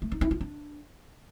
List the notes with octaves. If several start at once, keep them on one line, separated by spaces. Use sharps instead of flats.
A3
D#4
E4
F4
D4